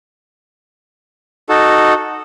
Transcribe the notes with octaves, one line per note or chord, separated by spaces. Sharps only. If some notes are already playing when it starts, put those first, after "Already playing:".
D#4 F#4 A4